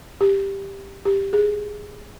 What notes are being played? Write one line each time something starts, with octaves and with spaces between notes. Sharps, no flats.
G4
G4
G#4